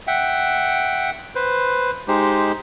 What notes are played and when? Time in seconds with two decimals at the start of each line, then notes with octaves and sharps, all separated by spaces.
0.07 E5 F#5 G5
1.35 B4 C5
2.08 G#3 D#4 G4 C5